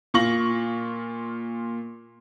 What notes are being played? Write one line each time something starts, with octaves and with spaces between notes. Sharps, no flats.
A#2 F4 C#6 A#6 F#7